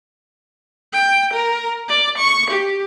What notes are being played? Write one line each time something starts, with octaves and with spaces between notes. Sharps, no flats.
G5
A#4
D5
C#6
G4